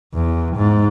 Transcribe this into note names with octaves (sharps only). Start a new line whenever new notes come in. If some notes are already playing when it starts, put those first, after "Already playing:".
E2
G#2